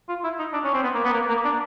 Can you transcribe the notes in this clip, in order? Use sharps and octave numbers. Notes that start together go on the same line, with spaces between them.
F4
E4
D#4
D4
C#4
C4
B3
A#3
B3
A#3
A#3
D4